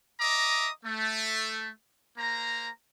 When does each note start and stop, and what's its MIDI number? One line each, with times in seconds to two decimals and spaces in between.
0.21 0.68 75
0.21 0.68 76
0.21 0.68 82
0.21 0.68 86
0.21 0.68 87
0.84 1.68 57
2.18 2.68 58
2.18 2.68 72
2.18 2.68 82